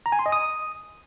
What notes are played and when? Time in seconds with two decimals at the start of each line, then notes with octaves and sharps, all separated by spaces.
0.06 A#5
0.12 G#5
0.19 C6
0.26 D#5
0.32 D#6